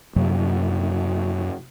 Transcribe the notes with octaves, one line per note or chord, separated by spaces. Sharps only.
F#2 C3 F#3 A#3